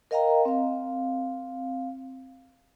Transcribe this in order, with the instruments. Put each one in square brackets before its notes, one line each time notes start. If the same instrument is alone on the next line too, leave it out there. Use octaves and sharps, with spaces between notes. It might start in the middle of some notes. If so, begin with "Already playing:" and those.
[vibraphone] A#4 D#5 F5 G5 A#5
C4 F5